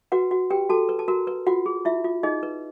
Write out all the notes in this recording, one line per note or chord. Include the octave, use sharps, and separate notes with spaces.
F#4 B4 F#5
F#4 F#5
G4 B4 G5
F#4 A4 A5
B4
A5
F#4 A#4 A#5
B4
F4 F#4 F#5
G#4
E4 F4 E5
F4
D#4 G#4 D#5
B4